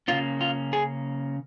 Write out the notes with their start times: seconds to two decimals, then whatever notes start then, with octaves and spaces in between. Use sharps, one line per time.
0.08 C#3 A#3 C#4 F4
0.41 F4
0.73 G#4